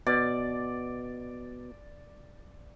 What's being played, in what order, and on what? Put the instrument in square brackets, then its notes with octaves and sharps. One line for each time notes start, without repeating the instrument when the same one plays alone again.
[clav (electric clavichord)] B2 [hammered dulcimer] D5